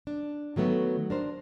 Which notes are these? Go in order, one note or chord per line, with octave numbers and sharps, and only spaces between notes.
D4
D#3 F#3 A3 B3
D4 A#4 C5